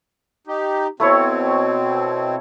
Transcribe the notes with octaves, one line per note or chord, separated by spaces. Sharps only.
D#4 G4
B2 A3 C4 E4 C#5